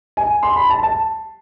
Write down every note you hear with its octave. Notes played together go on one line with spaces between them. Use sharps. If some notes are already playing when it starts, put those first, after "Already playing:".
G#5
C6
B5
A5
A5